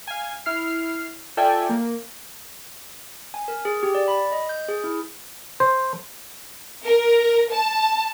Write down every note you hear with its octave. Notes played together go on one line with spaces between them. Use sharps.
F5 G#5
E4 F6 C7
F4 A4 D5 E5 G5 G#5
A#3
G#5
A#4
G#4
G4
D5
B5
D#5
G6
G#4
E4
C5
A#4
A5